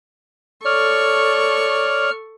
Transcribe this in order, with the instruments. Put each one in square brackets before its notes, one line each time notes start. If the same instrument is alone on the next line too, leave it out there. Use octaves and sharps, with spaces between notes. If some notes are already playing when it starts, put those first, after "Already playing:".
[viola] A4 C#6 [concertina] C#5 D5 [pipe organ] F6